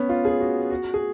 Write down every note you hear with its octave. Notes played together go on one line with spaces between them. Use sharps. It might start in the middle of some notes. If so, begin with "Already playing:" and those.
Already playing: B3 C#4
F4
G#4
F#4
F#4
G#4